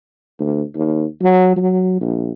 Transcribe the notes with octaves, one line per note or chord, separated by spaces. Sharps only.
D2
D#2
F#3
F#3
A#1